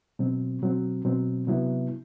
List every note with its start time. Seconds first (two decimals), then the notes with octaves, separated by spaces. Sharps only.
0.19 B2 F#3 C4
0.62 B2 F#3 C4
1.04 B2 F#3 C4
1.47 C3 F#3 B3 E4